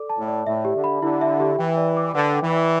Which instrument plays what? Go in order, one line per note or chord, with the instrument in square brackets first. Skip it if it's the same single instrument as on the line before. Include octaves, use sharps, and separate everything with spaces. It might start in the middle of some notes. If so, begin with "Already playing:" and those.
Already playing: [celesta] A4 D5 D6
A5
[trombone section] A2
[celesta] D5
[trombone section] A2 [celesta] E5
[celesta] G4
[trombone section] D3
[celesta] B5
[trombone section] D3 [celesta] E4
[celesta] E5
G4
[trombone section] E3 [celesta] G5
[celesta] D5
D6
[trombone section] D3 [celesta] B4
[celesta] G5
[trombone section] E3
[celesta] D5